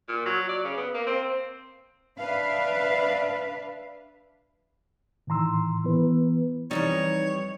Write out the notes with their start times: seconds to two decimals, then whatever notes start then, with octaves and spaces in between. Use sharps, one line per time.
0.08 A#2
0.26 F#3
0.49 D5
0.64 C#3
0.77 B3
0.94 A#3
1.06 C4
2.19 D4 B4 E5 F5
5.27 A2 D#3 E3 A#5 C6 E6
5.84 E3 B3 B4
6.71 F2 E3 G3 D#4 C#5 D#5